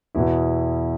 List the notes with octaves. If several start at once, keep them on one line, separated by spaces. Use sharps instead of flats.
E2 B2 E4